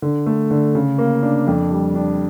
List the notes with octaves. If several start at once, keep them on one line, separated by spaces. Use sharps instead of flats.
D3
A3
D3
C#3
A#3
D4
F2
G3
D4